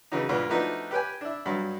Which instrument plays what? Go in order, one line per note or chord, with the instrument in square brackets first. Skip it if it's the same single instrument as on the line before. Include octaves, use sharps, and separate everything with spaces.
[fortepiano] C#3 E3 F#3 D#4
D2 G#2 B3 F4 B5
F3 A3 B3 D4 D#4 F#4
G4 B4 G5 G#5
D4 E4
G2 F#3